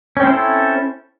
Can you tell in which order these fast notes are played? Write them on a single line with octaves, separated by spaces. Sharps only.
C#4 C4 C5 E4 A4